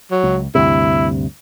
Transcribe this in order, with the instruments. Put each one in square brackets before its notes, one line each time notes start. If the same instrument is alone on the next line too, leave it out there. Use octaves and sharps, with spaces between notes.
[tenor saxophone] F#3
[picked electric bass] C#2
[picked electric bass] D2 G2 C3 [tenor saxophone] E4